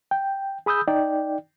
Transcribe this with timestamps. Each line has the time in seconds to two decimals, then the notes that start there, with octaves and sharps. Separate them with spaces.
0.11 G5
0.66 G#4 B5 D#6 E6 G6
0.88 D#4 D5 G5